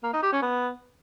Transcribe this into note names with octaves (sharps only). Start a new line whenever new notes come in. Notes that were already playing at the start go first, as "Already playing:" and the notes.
A#3
D#4
G4
C#4
B3